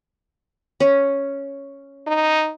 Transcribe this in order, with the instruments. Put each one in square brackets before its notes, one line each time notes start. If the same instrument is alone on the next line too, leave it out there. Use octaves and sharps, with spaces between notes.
[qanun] C#4
[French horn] D#4